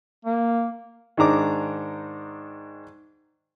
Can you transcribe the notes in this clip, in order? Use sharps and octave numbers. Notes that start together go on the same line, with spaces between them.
A#3
G#2 D#3 D4 A#5 D6